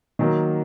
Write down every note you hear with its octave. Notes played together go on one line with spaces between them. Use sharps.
D#3 F#3 A#3